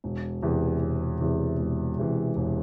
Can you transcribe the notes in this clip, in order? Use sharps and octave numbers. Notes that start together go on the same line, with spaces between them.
E1
E2 C3 E3
E1
E2 C3 E3
E1
E2 C3 E3
E1